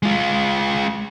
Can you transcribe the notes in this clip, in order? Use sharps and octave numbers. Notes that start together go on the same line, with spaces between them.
G#3 F4